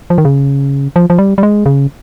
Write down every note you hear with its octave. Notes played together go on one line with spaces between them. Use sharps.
F3
D#3
C#3
F3
F3
G3
G3
G#3
C#3